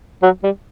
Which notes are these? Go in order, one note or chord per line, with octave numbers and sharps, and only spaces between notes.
F#3
G3